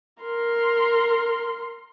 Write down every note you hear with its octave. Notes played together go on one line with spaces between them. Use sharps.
A#4 C6